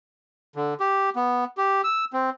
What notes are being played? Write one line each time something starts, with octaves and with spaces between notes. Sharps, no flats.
D3
G4
B3
G4
E6
C4